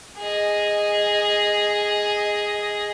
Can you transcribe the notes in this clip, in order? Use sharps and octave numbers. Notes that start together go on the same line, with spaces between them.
G#4 D#5